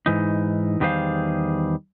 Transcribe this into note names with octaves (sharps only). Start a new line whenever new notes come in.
G#2 E3 D#4
E2 D#3 G3 G#4 C5 F5